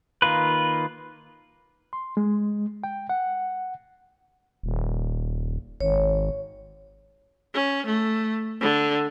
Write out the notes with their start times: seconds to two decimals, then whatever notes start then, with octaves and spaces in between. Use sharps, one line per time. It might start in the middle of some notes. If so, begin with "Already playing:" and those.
0.22 D#3 A#3 F4 B4
1.93 C6
2.17 G#3
2.84 G5
3.09 F#5
4.63 D#1
5.81 G#1 C#5
7.54 C#4
7.86 A3
8.61 D3